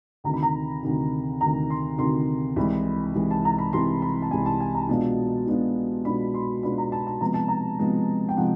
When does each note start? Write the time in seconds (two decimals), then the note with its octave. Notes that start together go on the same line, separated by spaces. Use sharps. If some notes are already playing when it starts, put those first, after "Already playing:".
0.24 D2 C3 D#3 A#5
0.34 B5
0.43 A#5
0.83 D2 C3 D#3
1.41 D2 C3 D#3 A#5
1.70 C6
1.98 D2 C3 D#3 C6
2.56 C2 C3 E3 G#3 B5
3.15 C2 C3 E3 G#3
3.31 A5
3.45 A#5
3.58 B5
3.72 C2 C3 E3 G#3 C6
4.02 B5
4.22 A5
4.31 C2 C3 E3 G#3 G#5
4.46 A5
4.60 G#5
4.75 A#5
4.89 B2 G#3 B3 D4 F4 A5
5.47 B2 G#3 B3 D4 F4
6.05 B2 G#3 B3 D4 F4 B5
6.34 C6
6.62 B2 G#3 B3 D4 F4 B5
6.78 A#5
6.92 A5
7.07 A5
7.21 C3 F3 G#3 B3 A#5
7.34 A5
7.48 A#5
7.79 C3 F3 G#3 B3
8.29 G5
8.37 C3 F3 G#3 F#5